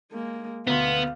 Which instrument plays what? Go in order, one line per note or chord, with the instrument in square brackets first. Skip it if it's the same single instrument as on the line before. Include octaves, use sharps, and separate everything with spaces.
[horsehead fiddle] G#3 A#3
[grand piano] D2 C6 [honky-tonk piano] B2 [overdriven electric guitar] B3 [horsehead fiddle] F5